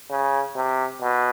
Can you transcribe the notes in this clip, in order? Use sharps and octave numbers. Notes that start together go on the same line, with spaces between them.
C#3
C3
B2